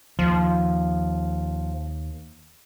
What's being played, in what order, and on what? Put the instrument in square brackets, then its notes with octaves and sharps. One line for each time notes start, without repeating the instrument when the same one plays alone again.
[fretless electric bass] D#2 [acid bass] F3